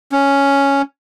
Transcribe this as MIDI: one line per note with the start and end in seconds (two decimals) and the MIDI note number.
0.12 0.82 61